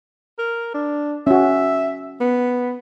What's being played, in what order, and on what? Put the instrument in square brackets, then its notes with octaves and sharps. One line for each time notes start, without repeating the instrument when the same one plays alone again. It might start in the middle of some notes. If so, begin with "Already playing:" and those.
[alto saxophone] A#4
D4
[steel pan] C#4 F#4 [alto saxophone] E5
[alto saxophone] B3